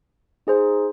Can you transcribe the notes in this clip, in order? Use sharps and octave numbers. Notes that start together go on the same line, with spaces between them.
D#4 G#4 C5